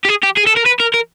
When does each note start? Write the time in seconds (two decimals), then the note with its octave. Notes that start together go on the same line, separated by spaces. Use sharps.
0.05 G4
0.09 G#4
0.23 G4
0.37 G#4
0.47 A4
0.57 A#4
0.66 B4
0.80 A#4
0.94 A#4